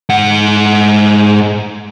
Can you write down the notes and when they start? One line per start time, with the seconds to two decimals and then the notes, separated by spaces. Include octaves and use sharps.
0.09 G#2 F#5